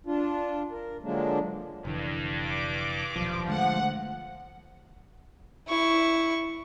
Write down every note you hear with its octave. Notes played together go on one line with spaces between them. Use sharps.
D4 F4
A#4
D3 F3 F#3 G#3 A#3 D4
F1 G2 D3 E3
D6
D#1 B1 F3
D3 G#3 A3 F#5
E4 C#6